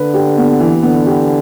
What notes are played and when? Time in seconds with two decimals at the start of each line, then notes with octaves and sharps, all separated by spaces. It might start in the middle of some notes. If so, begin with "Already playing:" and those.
Already playing: D3 B4
0.14 G4
0.38 B3
0.60 E3
0.82 D3 B3
1.06 G4